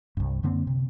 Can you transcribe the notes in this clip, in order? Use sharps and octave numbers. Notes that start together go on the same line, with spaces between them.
C2 G2
F#2 D3 A#3 C4
C3